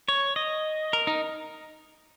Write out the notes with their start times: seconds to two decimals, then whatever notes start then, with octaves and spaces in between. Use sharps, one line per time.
0.08 C#5
0.36 D#5
0.93 A#4
1.07 D#4